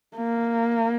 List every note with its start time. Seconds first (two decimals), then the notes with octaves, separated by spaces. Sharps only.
0.16 A#3